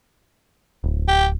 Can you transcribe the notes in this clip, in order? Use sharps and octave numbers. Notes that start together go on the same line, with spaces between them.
D1
G4